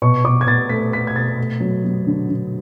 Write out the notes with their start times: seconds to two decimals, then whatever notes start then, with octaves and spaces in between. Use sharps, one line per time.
0.02 B2 C#6
0.24 B2 D6
0.41 G#6
0.47 B2 A6
0.69 A3 B6
0.93 A3 B6
1.07 G#6
1.16 B2 A6
1.38 A3
1.60 F#3
1.84 F#3
2.07 D3
2.29 D3